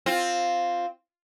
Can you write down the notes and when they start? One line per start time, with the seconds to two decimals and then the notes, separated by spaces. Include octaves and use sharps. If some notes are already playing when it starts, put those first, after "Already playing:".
0.06 C4 F4